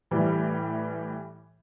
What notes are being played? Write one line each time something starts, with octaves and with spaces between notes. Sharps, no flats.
A2 E3 G3